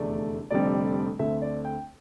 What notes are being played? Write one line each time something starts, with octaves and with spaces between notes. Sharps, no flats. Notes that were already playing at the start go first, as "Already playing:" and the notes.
Already playing: F1 E2 D3 A3 D5
F1 F2 D3 G3 C4 D5
D2 D3 A3 C4 E5
D5
G5